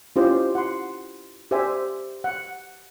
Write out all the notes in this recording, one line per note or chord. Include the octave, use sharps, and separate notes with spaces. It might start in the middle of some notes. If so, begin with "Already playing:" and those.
C#4 E4 F4 G4 C5 D#5
F#5 C6
G4 C5 D5 E5 G#5
F#5